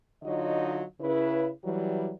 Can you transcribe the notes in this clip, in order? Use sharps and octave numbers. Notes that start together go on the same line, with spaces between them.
D3 F#3 D#4 F4 C#5 D#5
C#3 E4 B4
E3 F#3 G3